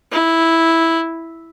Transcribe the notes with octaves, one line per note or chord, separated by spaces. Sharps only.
E4